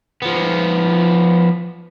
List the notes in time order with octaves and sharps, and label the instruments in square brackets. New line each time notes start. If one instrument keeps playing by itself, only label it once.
[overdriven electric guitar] F3 B3